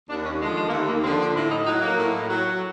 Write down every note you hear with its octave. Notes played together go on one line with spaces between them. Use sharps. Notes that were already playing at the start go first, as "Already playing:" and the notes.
D#2 D4
C#4
D3 F3 G#3
G#3
A#3
D#2 A3
A#3
D3 F3 C4
D4
A2 E4
D#4
F#3 D#4
A#3
A2
F#3